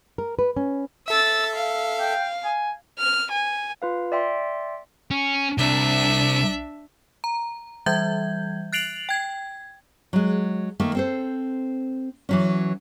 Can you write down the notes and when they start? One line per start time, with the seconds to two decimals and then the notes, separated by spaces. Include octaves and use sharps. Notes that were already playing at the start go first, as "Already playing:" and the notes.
0.18 A#4
0.39 B4
0.56 C#4
1.08 A4 E5 E6 A6
1.56 F5
2.00 G5
2.44 G#5
2.99 F6
3.31 G#5
3.82 F4 B4 F5
4.12 D5 E5 G5 C6
5.11 C#4
5.58 C2 D4 E5
7.24 A#5
7.86 E3 G3 E5 G6 G#6
8.73 F#6 A6 C7 D7 F7 F#7
9.09 G5 G#6
10.13 F#3 G#3
10.80 D#3 A3 A#3
10.95 C4 A4 C5
12.29 E3 F#3 C#4